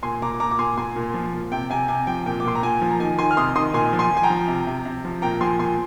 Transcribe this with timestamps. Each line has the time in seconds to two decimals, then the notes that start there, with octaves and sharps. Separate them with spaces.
0.03 A#2 G#5 C6
0.22 A#2 A#5 D6
0.40 A#2 A#5 D6
0.51 D6
0.59 A#2 G#5 C6
0.77 A#2 G#5 C6
0.96 A#2
1.14 F3
1.33 A#2
1.52 C3 G5
1.70 C3 G#5
1.88 C3 G#5
2.07 F3 G5
2.26 A#2 G5
2.40 D6
2.44 A#2 C6
2.55 A#5
2.63 A#2 G#5
2.82 F3
2.91 A#5
3.00 D#3 G#5
3.18 D#3 G#5 C6
3.31 F6
3.37 C3 C6 D#6
3.55 D#3 C6 D#6
3.74 A#2 G#5 C6
3.93 F3
3.99 G#5 C6
4.11 F3
4.17 G#5
4.23 G5 A#5
4.30 F3
4.48 C3
4.67 C3
4.85 C3
5.05 F3
5.22 A#2 G5 A#5
5.41 F3 G#5 C6
5.59 A#2 G#5 C6